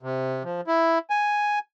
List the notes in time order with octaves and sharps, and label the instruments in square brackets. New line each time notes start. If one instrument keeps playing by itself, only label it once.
[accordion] C3
F3
E4
G#5